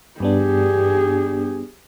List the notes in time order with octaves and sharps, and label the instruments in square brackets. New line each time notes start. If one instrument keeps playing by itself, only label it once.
[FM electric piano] G2 B3 D4 [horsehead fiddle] G4 G#4